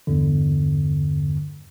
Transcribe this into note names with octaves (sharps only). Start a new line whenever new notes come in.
E2 G2 D3